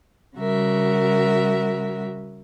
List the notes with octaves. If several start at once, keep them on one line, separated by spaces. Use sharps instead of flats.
C#3 G3 F#4 A#4 E5